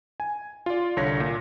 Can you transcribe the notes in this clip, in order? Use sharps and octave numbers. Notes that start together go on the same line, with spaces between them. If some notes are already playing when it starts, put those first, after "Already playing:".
G#5
F4 D5
C2 D3 C#5 A#6 B6
A#2